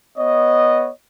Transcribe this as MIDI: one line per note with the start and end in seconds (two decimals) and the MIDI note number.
0.18 0.90 59
0.18 0.90 73
0.18 0.90 75